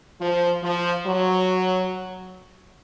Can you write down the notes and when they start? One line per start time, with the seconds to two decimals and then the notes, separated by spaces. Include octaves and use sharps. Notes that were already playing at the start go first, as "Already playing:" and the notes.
0.21 F3
0.63 F3
1.06 F#3